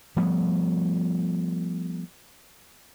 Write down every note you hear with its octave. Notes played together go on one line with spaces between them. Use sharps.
F3 G3 A3 B3